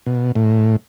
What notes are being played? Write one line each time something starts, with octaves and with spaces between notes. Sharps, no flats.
B2
A2